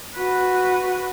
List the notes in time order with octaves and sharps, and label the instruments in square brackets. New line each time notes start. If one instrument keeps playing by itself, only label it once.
[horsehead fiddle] F#4 B4